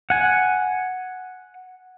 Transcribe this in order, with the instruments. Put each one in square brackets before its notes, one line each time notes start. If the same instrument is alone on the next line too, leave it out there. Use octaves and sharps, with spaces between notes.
[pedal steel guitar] F#5 G#5